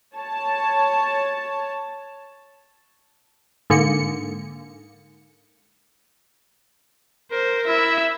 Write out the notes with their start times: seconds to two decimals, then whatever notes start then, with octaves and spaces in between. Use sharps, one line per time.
0.16 C#5 A5
3.70 G#2 D3 A#3 C#7
7.32 A#4 C5
7.67 E4 E5